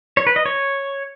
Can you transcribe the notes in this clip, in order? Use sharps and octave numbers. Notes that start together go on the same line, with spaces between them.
C#5
B4
D#5
C#5